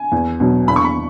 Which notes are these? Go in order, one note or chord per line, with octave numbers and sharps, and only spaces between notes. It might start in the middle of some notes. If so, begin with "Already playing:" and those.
Already playing: G#5
E2
B2 F#3
E2 B5
C#6
B5